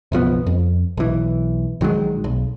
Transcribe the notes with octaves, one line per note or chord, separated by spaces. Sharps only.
F#1 B1 F3 B3
F2
B1 E3
A#1 D#3 F#3 G#3
B1